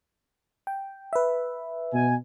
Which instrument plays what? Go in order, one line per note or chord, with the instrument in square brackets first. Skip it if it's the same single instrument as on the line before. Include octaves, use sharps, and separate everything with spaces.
[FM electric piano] G5
B4 E5
[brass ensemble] B2 G#5